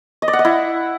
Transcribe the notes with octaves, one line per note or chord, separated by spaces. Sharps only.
D#5
D5
F#5
D#5
E4